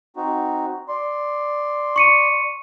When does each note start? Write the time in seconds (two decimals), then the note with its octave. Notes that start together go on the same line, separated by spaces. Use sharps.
0.16 C4 D#4 F#4
0.88 D5 C6
1.96 C#6 C#7 D#7